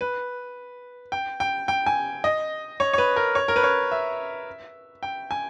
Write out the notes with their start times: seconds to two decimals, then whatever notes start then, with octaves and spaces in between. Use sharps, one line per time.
0.01 B4
1.12 G5
1.40 G5
1.68 G5
1.86 G#5
2.24 D#5
2.80 C#5
2.93 C#5
2.98 B4
3.16 A#4
3.35 C#5
3.48 A#4
3.56 B4
3.63 C#5
3.91 E5
5.03 G5
5.31 G#5